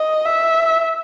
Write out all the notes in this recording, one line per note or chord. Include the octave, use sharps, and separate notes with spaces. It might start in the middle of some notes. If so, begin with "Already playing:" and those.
Already playing: D#5
E5